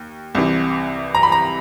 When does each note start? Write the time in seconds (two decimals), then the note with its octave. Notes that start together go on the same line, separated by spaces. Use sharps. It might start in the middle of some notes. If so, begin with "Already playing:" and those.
Already playing: D#2
0.35 C2 C3 E3
1.15 A#5
1.23 B5
1.32 A#5